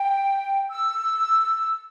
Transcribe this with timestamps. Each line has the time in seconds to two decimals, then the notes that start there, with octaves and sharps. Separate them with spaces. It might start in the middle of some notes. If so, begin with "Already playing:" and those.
Already playing: G5
0.69 E6